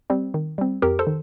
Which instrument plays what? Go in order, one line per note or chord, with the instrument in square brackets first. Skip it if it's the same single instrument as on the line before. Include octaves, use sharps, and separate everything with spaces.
[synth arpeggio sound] G3 C4
D#3
G3 C4
F2 G4 A#4
A4 C5
D#3